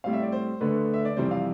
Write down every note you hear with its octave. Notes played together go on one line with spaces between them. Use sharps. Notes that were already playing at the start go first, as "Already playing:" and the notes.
A2 G3 C4 F5
E5
D5
C5
D2 D3 A3 B4
E5
D5
F2 C3 E3 G3 C4 C5
F5